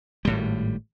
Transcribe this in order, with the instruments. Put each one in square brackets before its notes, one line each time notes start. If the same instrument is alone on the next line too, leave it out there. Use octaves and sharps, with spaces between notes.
[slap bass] G#1 A2 G3